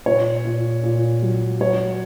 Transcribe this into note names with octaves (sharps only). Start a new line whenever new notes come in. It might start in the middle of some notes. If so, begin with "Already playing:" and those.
A#2 C#5
A#2
A#2
F#3
F#3 C#5